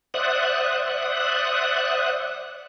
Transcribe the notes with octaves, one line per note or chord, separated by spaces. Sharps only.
C5 D5 E5 F#5 D#6 F#6